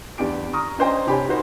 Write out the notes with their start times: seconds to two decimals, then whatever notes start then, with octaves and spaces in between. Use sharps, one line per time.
0.18 E2 D4 G4 D7
0.53 A#5 C#6 D#6 F6
0.78 C#4 D4 C5 D#5 G5 A#5
1.07 C3 D4 G4 C#5 G#5 B5
1.28 D#4 F#4 A#4 C5